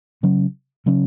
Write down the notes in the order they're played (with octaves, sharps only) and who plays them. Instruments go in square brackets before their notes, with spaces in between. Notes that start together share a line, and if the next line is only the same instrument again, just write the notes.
[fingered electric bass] C#3 F#3 C#4
C#3 F#3 C#4